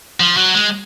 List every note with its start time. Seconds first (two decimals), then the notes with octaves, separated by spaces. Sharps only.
0.20 F3
0.37 F#3
0.54 G#3